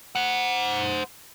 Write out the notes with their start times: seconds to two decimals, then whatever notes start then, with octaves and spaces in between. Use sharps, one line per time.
0.15 C5 F#5